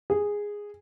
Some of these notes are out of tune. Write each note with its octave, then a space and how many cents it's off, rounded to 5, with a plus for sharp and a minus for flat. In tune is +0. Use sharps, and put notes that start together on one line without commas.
G#4 -10